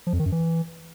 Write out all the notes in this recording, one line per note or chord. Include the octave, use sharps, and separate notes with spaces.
F3
F2
D#3
F#2
E3